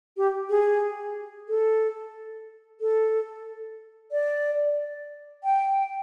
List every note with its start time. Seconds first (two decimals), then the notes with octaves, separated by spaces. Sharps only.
0.17 G4
0.50 G#4
1.49 A4
2.81 A4
4.12 D5
5.44 G5